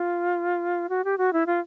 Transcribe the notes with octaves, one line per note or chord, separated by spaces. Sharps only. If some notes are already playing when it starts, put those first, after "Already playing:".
Already playing: F4
F#4
G4
F#4
E4
F4